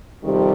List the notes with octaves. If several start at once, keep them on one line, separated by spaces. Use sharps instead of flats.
F2 C3 D#3 G3